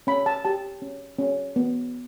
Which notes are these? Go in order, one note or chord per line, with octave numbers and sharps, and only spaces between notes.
C#4 B5
A5
G4 A5
C#4
C#4
B3